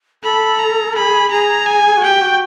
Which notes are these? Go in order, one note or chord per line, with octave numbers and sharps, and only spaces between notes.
A4 B5
A#5
G#4 B5
G#4 A#5
G#5
F#4
G4 G5
F#4